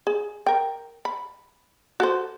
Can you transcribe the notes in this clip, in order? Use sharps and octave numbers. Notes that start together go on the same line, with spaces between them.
G#4
A#4 G5
B5
F#4 A4 C5